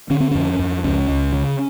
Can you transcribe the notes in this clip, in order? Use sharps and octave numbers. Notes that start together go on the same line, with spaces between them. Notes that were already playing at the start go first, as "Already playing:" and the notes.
D3 C#4
C4
F2 C#4
F2
C#2 C#4
C#2
C#3